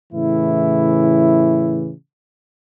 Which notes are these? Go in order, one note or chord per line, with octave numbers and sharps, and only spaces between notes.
A2 C#3 E3 E4